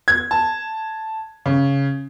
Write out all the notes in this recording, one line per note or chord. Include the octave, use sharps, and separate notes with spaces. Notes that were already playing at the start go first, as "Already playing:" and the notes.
G#6
A5
C#3